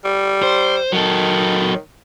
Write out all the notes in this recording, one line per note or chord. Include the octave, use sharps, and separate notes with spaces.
G3
C5
D#3 F#3 A4